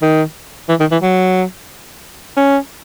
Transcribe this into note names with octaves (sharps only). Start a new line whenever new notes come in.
D#3
E3
D#3
E3
F#3
C#4